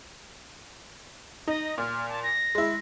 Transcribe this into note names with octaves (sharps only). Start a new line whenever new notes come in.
D#4 D#5
A#2 F6
A5
A#6
G#3 E4